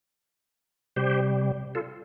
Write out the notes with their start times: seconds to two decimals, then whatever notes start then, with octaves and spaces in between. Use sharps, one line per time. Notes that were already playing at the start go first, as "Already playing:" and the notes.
0.96 C3 G3 G4 C5
1.75 F4 A4